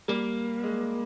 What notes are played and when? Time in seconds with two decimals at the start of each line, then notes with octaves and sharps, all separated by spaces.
0.08 G3 A#3
0.63 G#3